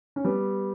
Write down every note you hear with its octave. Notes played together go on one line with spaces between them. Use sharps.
C#4
G3 B3